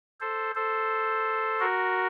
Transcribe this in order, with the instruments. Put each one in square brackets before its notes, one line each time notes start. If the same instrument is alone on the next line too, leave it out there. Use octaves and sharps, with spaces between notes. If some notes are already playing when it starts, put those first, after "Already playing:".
[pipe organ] A4 C5
A4 C5
F#4 A#4